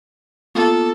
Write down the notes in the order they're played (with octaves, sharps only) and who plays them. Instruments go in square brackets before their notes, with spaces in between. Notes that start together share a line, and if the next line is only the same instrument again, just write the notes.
[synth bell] A#3 B3 F4 [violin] A4